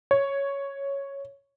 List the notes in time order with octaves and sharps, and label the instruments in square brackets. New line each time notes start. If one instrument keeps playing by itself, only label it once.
[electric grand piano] C#5